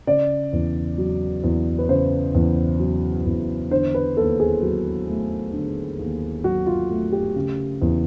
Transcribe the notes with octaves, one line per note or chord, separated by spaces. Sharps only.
C#3 D5
E2
F#3
E2
B4
C#3 C5
E2
F#3
E2
D3 C5
B4
D#2 A4
G#4
F#3
A3
D3
D#2
F#3 F#4
F4
A3
G4
C#3
E2